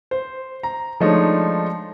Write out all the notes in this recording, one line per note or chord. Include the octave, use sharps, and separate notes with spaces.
C5
A#5
F3 G#3 A3 D4 D#4 C#5